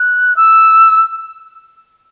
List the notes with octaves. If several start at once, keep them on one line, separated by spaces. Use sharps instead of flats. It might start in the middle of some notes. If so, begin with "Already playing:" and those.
Already playing: F#6
E6